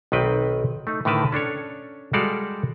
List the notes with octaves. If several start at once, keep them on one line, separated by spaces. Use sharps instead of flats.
B1 D#3 C4 B4 G5
A3 D#4
A2 D3 D#3 A#4 B4 A5
C#4 D4 A4 C#5
G3 G#3 F#4 A4 D5 F5